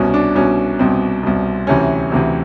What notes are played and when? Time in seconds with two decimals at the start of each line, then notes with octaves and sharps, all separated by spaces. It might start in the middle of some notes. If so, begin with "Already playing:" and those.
Already playing: C2 B2 C#4
0.14 D4
0.35 C2 B2 C#4
0.79 C2 B2 C4
1.23 C2 B2
1.67 D2 C3 E3 C#4
2.12 D2 C3 E3